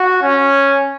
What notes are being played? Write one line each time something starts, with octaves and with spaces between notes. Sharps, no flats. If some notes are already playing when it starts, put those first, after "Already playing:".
Already playing: F#4
C#4